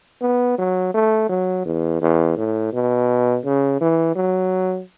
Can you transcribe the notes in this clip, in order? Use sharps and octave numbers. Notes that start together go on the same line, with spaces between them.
B3
F#3
A3
F#3
E2
E2
A2
B2
C#3
E3
F#3